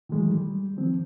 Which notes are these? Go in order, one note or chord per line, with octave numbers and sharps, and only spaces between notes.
D#3 E3 F#3 G#3 A3
G3
D#3 F3 C4